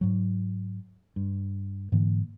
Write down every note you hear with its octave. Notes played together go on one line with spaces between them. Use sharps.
G#2 F#3
G2
G#2 D3 E3 A#3